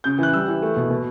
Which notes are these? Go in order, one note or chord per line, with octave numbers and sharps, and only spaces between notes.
C#3 G6
E3 F#6
G3 E6
E3
A3
B2
B2